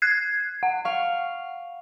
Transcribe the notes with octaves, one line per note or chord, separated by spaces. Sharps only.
F#6 G#6 C7
F#5
F5 C#6